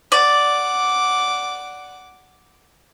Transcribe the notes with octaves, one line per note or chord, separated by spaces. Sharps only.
D5 F#5 D6